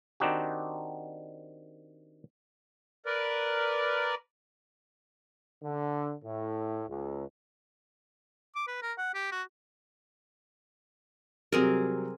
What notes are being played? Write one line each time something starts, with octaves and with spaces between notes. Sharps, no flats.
D#3 C4 D4 D#4 F#4 G4
A#4 B4 D5
D3
A2
C#2
D6
B4
A#4
F#5
G4
F#4
C3 F#3 G3 C4 G#4 A#4